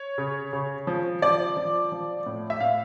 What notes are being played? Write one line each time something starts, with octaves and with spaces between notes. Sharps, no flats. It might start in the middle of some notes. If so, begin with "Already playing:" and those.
Already playing: C#5
C#3
C#3
F3
F3 D5
F3
F3
A2
E5
A2 F5